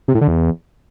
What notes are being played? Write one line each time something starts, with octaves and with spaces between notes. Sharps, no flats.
C3
A2
D3
E2